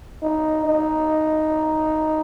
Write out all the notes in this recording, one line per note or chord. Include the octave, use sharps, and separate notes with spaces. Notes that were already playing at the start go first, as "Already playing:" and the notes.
D#4
D#4